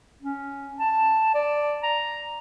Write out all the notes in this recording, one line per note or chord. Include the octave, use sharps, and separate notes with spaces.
C#4
A5
D5
A#5